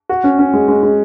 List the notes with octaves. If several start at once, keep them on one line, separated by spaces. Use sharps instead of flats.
F#4
C#4
C#4
G#3
G#3
G#3